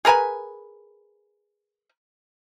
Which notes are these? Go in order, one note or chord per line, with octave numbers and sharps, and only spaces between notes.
G#4 A#4 B4 G#5